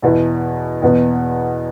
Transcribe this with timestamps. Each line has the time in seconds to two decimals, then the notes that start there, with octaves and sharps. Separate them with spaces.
0.02 E2 B2 B3 E4
0.82 E2 B2 B3